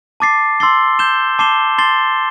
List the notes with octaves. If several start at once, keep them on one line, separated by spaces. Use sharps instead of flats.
A5 D6 A6 C7
C6 E6 A6 C7 G7
G6 E7 G7
A5 D6 C7 E7 G7
C6 A6 C7 G7